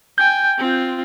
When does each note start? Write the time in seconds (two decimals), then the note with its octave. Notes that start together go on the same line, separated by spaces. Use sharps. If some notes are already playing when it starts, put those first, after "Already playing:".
0.18 G5 G#5 G6
0.58 C4 F4